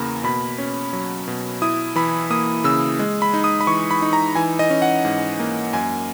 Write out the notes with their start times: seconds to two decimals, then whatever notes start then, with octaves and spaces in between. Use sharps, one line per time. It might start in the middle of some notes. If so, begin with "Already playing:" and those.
Already playing: E2 C#3 E3 A#3 A#5 B5
0.24 B2 B5
0.58 C#4
0.93 F#3
1.28 B2
1.62 E4 D#6
1.96 E3 B5
2.30 A#3 D#6
2.64 C#3 E6
2.99 G#3
3.22 B5
3.34 D#4
3.44 D#6
3.61 B5
3.67 E3 C#6
3.91 B5
4.02 D#4
4.13 A#5
4.35 E3 G#5
4.59 D#5
4.70 C#4
4.82 F#5
5.05 G#2
5.39 A#3
5.73 F#2 G#5